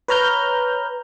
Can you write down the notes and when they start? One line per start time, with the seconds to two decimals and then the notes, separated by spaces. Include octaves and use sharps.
0.08 B4 C#5 A#5 F6 G6